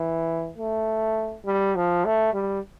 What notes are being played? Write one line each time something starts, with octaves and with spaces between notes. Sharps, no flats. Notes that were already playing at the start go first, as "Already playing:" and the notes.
Already playing: E3
A3
G3
F3
A3
G3